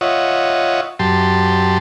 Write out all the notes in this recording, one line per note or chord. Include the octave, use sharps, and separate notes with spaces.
F4 C#5 D#5 E5 F#5
F#2 G4 A5 C6